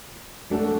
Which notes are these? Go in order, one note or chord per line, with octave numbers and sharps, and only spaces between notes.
F#3 A3 D4 F#4 A4